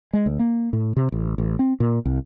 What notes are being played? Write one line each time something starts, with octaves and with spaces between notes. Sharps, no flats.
G#3
D2
A#3
A2
C3
A1
A1
C4
A#2
C2